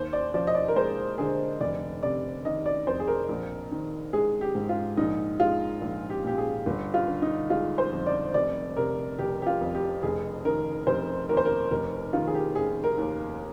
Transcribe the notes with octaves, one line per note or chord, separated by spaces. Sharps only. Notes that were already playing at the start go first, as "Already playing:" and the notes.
Already playing: D#2 C5
D5
F3 D5
D#5
D5
A#4
G#3 C5
D3 G#4
F1 D5
C3 D5
D#3 D#5
D5
F2 C5
G#4
A#4
A#1
D#3
G#3 G#4
G4
G#2
F4
A#1 D#4
G#3 F4
A#1
G4
A#2 G4
G#4
G1
F4
D3
D#4
G#3 F4
C5
F2
D5
F1 D5
C3 A#4
F1 G4
G4
F4
F2
G4
F1 G#4
D#3 A#4
F1 C5
D#2 A#4
C5
A#4
F1 A#4
D#3 F4
G#4
G4
F1 G#4
A#4
D#2